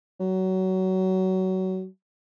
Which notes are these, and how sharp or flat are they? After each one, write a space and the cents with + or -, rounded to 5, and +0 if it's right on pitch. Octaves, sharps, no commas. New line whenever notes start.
F#3 +20